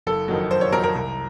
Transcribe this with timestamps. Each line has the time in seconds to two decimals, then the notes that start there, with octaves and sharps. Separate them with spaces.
0.07 F#1 A4
0.28 F2 D#3 F#3
0.51 F#1 C5
0.61 C#5
0.72 F2 D#3 F#3 A#4
0.84 A#4
0.95 C2